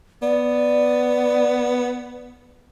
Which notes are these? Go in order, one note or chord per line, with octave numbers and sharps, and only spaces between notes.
B3 D5